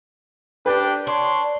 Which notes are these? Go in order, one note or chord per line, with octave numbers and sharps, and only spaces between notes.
D4 G4 B4 G5
D4 C#5 C6